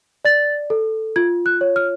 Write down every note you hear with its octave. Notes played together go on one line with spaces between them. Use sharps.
D5 A6
A4
F4 G#6
F#6
C#5
F6